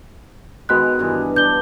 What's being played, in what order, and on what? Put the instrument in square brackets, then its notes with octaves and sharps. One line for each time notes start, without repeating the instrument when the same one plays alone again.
[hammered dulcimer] D#3 G#3 B3 [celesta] F#4 F#6
[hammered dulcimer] G2 E3
[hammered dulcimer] D4 [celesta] G6 G7